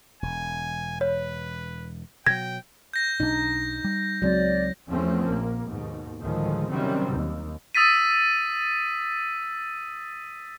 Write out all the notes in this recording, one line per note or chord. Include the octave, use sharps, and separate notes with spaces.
E1 G#5
B4 C#5
B2 F#3 G5 G#6 A#6
G6 A#6
B1 D4 D#4
G3
C#2 F#3 G#3 C4 D5
E2 F3 A3 C4 C#4
A#1 A#3
D#2 G#2 B2
D2 A2 D#3 F3 G#3
C3 D#3 F#3 G3 C4 C#4
D#2
D#6 E6 A6 B6 D#7